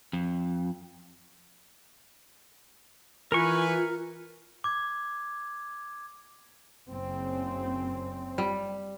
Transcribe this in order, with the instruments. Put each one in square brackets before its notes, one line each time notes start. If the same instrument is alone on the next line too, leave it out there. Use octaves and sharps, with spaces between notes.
[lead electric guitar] F2
[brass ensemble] E3 B4 G#5 [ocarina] F4 [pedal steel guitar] A#4 C#6
[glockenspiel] D6 G#6
[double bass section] F#1 C#3 C4
[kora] G3